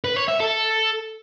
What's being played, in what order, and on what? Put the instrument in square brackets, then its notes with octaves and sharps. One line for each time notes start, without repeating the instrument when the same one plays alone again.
[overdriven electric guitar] B4
C#5
E5
A4